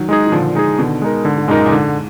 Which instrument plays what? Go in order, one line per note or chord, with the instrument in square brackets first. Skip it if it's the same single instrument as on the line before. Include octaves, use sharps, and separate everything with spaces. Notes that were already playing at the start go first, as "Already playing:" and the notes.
Already playing: [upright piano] D#3 F#3
[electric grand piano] G#3 D#4 G#4
[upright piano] D#3
[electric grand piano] A#2 [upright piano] D3 F3
[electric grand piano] G#3 D#4 G#4
[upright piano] B2 D#3 [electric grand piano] D3
[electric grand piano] G#3 D#4 A#4
[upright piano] G#2 [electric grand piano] D3
[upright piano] G#2
[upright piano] F#2 A#2 [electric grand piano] G#3 D#4 A#4
[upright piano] A#2
[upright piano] G#2 [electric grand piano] D3